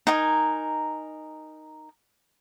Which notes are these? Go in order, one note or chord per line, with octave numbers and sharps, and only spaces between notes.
D#4 A#4 G#5